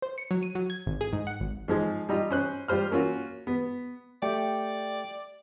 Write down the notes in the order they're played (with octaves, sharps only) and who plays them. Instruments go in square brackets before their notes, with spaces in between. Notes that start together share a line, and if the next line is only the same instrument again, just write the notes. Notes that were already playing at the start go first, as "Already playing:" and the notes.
[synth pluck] C5
C#7
F#3
D#7
F#3
G#6
G#1
G#4
G#2
F#5
G#1
[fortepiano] G#2 F3 G#3
G3 D#4 F4
C#4 C5 F#6
G3 F4 C5 F6
A#3 C#4 F4 F#4
B3
[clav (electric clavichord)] A3 G4 [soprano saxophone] D5 [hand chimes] G5